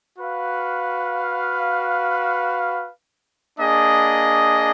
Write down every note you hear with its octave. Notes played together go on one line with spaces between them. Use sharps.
F#4 B4 F5
A#3 D4 G#4 D#5